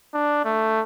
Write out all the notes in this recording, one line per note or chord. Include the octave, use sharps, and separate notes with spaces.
D4
A3